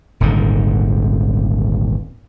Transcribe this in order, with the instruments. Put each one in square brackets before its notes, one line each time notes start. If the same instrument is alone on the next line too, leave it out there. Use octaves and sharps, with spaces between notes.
[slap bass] D#1 G#1 G#2 D3